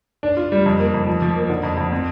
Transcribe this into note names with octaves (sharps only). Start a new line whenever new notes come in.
D4
F4
G3
F2
A#3
F2
F3
F3
A#3
D3
F2
F2
C4